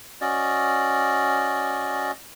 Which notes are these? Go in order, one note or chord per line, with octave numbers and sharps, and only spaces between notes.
C#4 F#4 D5 D#5